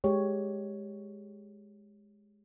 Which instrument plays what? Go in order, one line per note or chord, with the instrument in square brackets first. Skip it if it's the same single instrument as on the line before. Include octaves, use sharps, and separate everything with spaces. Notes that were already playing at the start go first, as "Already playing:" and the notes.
[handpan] G#3 G4 C#5